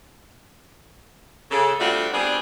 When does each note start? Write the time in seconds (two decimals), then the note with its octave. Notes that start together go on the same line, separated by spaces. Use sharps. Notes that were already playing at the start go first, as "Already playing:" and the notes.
1.51 C#3 A4
1.80 G3 A3 C4 D4 F4 F#4
2.13 G3 B3 C4 D4 G#4